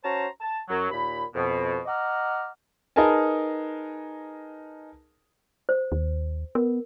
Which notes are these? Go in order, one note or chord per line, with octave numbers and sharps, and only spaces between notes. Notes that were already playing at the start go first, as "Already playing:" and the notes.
C#4 F#4 C5 A5 A#5
A5
F#2 F#3
D#2 A#2 B5
F2 B2
D#5 F#5 A#5 D6 F6
D#4 G#4 A#4 B4 G#5 A5
C5
D#2
B3 A#4